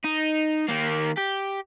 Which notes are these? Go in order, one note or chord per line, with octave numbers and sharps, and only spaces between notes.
D#4
D#3 A#3
G4